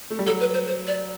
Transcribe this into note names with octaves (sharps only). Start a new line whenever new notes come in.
A3
G3
F#3 A4
B4
C5
C5
D5